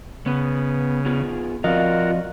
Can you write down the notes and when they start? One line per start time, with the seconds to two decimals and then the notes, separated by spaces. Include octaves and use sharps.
0.26 C#3 B3 B4
1.06 B3 F4 G#4
1.64 F3 C4 F4 F#4 A#4 D5 D#5 F5